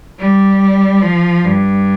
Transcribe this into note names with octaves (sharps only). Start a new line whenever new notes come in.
G3
F3
G2